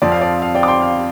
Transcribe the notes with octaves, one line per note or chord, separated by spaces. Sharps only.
F2 F3 C4 D5
F5
D5
F5
D5 G5
D6
G5 C6
F5